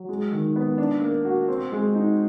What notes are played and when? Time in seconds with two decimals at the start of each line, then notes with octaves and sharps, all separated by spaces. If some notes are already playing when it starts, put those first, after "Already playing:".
Already playing: F#3
0.09 G#3
0.33 D#3
0.56 B3
0.78 D4
1.01 A#3
1.25 F#4
1.48 C4
1.72 G#3
1.95 D#4